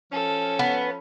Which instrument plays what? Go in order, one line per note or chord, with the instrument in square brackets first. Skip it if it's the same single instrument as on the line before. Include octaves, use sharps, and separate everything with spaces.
[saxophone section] F3 C#4 [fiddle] A4
[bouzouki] B3